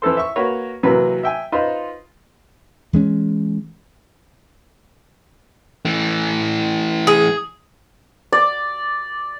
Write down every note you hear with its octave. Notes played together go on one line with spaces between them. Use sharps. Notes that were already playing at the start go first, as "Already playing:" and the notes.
E3 E4 A4 C5
E5 C#6
A#3 F#4 B4 C#5
C3 E3 F#3 A#3 B4
E5 G5 G#5
D#4 F4 B4 C5
E3 G#3 C#4
E3 A3
G#4
D5